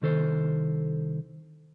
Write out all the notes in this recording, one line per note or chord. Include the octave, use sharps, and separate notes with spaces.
C2 D#3 A4 C5